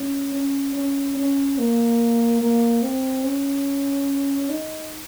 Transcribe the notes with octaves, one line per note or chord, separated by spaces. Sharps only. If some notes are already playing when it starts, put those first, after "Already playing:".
Already playing: C#4
C#4
C#4
C#4
A#3
A#3
C4
C#4
D#4